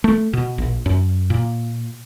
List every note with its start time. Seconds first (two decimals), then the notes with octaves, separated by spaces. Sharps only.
0.04 A3
0.33 B2
0.58 A#1
0.86 F#2
1.30 A#2